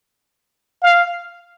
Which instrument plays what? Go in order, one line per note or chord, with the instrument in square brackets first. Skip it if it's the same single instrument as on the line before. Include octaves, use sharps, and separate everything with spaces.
[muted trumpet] F5